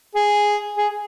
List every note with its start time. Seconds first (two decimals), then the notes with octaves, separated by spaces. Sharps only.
0.15 G#4
0.77 G#4